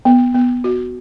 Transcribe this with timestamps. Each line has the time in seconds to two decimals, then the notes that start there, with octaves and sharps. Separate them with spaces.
0.05 B3
0.34 B3
0.64 F#4